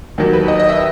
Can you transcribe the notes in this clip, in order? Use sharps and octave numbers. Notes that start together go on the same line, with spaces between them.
D#2 D#3 F#3
B4
D#5
D#5
E5